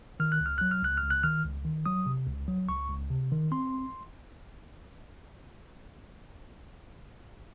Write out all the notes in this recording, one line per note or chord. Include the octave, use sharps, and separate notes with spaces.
D#3 F6
F#6
C#2
F6
F#3 F#6
F6
C#2 F#6
F6
C#2
F#6
D#3 F6
C#2
D#3
F#3 D#6
C3
C#2
F#3
C#2 C#6
C#2
C3
D#3
C4 C6